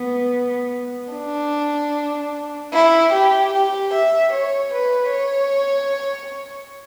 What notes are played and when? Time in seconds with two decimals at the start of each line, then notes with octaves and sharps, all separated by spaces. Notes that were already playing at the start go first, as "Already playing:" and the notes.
Already playing: B3
1.13 D4
2.72 E4
3.12 G4
3.52 G4
3.93 E5
4.33 C#5
4.73 B4
5.11 C#5